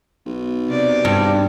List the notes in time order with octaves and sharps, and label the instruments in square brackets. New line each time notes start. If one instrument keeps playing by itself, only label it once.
[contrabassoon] B1
[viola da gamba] C3 D5
[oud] G2